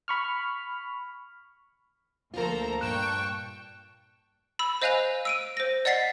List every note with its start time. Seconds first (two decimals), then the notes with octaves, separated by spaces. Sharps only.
0.08 B5 C#6 F6
2.34 D2 F3 A#3 F4 A4 A#4 C5 A#5
2.81 G2 A#2 D4 G5 A5 C#6 F#6 E7
4.59 B5 E6
4.82 C5 D#5 F5 G#5 F#6 F7
5.25 E6 D7 D#7
5.57 C5 A#6
5.85 D5 D#5 F#5 A6 B6 C7